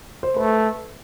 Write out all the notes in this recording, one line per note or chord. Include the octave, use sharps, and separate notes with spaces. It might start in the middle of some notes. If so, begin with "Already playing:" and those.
C5
A3 B4